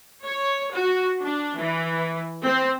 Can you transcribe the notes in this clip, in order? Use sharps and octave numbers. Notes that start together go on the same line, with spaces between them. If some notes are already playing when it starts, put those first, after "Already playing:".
C#5
F#4
D4
E3
C4